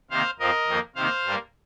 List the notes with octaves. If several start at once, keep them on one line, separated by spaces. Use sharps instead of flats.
C3 D#3 A#3 C5 F5
F2 F3 C4 A#4 D#5
F2 D#3 A#3
C3 D#3 A#3 C5 F5
G2 G3 A#3